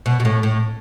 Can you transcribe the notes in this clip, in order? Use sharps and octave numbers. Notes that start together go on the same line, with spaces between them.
B2
B2
A2
A2